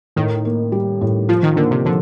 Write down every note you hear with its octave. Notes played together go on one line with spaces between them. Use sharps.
A2 D#3
A#3
G3
A2
F3 F4
D#3
D3 A#3
C3
D3 F3